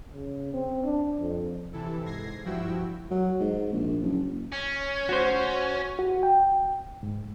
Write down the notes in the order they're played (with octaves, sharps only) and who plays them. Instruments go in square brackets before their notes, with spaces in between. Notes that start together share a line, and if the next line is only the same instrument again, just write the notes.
[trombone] C#3
C4
D4
F2
[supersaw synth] C3 E3 E4 A4
G#2 G#6 A#6 C7
G2 F3 E4 F#4 G5 E6
[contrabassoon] F#3
G#2
A#1
F#1
[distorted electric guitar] C#4
[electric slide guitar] F#4 C5
[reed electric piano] F#4
G5
G#2